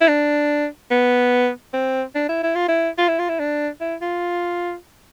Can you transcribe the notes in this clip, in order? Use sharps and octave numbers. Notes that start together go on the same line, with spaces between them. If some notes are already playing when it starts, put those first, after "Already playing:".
E4
D4
B3
C4
D4
E4
E4
F4
E4
F4
E4
F4
E4
D4
E4
F4